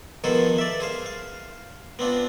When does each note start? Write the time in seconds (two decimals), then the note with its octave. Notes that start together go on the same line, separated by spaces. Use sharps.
0.24 D#3 F3 B3 G#4 A4 C5
0.58 D5 E5
0.80 G#4 C5 F5
1.06 F5
1.99 B3 C4 D4 F4